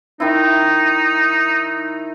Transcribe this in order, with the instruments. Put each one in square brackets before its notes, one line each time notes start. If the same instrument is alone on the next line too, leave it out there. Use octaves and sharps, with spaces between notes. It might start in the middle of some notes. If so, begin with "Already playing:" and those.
[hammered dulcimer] D#3 E4 [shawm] D#4